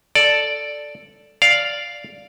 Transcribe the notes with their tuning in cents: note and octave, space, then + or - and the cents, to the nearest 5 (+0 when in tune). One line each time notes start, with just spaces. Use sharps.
A4 +0 D5 +0
D5 -5 F5 +0